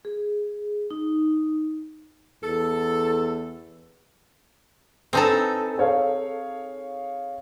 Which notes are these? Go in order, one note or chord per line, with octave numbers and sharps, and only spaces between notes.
G#4
D#4
E2 A4
C4 D#4 A4 B4 G#5 A5
G#4 C#5 F5